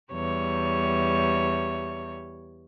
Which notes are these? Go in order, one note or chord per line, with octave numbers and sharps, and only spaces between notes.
E2 G3 C#5